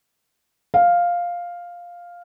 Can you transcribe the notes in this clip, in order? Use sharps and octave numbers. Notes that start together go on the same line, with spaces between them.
F5